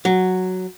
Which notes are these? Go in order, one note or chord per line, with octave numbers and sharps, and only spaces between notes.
F#3